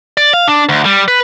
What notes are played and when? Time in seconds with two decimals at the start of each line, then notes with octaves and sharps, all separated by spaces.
0.17 D5
0.33 F5
0.48 D4
0.69 D2
0.85 G3
1.08 B4